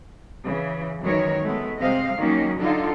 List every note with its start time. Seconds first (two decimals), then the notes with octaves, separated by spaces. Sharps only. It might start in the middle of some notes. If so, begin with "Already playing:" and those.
0.44 C#3 E3
1.02 F#2 D#3 E3 G#3 A#4 C#5
1.41 G#3 A3 B3
1.78 C3 G#3 C4 D#5 F5
2.18 D#3 F#3 A#3 C#4 D#4
2.59 D3 D#4 F4 A4